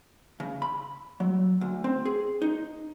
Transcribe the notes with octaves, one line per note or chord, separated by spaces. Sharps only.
C#3
B5
F#3
D2
C4
G#4
D#4